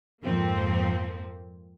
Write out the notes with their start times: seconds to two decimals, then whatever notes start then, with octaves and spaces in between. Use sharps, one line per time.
0.24 F2 G#2 F3 A#3 C4